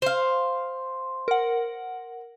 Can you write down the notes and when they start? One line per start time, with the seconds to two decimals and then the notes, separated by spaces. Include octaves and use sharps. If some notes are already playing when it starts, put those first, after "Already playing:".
0.02 C5 F5
1.28 A#4 F#5